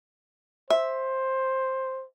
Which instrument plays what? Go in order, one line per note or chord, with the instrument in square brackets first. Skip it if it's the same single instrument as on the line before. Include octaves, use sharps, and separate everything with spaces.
[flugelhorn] C5 [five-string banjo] E5